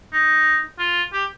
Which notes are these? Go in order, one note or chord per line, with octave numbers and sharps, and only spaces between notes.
D#4
F4
G4